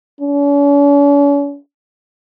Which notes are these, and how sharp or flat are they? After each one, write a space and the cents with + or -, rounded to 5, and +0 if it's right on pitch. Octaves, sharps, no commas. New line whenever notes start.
C#4 +45